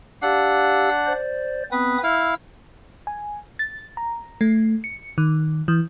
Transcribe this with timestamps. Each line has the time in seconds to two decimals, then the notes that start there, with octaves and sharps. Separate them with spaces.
0.22 D4 G4 F5 F#5 E6
1.07 C5 D5
1.72 B3 C4 B4 D#6
2.03 E4 F5 E6
3.07 G#5
3.59 A6
3.97 A#5
4.41 A3
4.84 C#7
5.18 D#3
5.68 E3